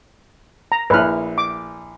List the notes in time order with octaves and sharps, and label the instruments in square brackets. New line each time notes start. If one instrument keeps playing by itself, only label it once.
[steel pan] A#5
[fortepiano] A#1 F6 [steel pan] E4 B4
[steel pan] D6